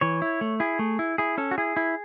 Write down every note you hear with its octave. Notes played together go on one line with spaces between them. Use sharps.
E3 C#5
E4
A3
E4 G#4
A3
E4
E4 G#4
C#4 A4
F#4
E4 G#4
E4